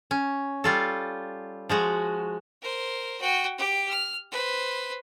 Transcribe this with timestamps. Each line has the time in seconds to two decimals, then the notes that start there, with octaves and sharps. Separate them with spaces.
0.11 C#4
0.64 G3 F4 A4
1.69 F3 G#3 F#4
2.62 A#4 C5
3.21 F#4 G5
3.58 G4 D6
3.89 F6
4.31 B4 C5